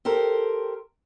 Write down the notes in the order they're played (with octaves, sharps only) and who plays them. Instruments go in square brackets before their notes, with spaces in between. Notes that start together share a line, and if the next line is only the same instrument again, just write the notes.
[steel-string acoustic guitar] G4 A4 A#4 C5